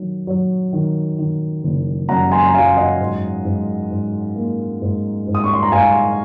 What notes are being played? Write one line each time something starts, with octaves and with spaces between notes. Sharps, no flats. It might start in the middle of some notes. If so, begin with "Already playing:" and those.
Already playing: D#3 F#3
F#3
D#3
D#3
F#1
F#2 F#5 A#5
G#5 C6
A#5
F#3 F5 G#5
D#5 F#5
G#2
G#2
G#2
A#3
G#2
G#2
D#6
C#6
C6
A#5
G#2 F5 G#5